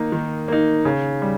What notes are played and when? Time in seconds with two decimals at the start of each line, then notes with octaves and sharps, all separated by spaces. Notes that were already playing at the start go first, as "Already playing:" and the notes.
Already playing: D#3 A#3 D#4
0.12 D#3
0.48 A#3 D#4
0.85 C#3
1.22 G3